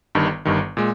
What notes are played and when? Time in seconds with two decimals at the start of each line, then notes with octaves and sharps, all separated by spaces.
0.15 G1 G2 D#3
0.45 G1 G2 D#3
0.77 A#2 G#3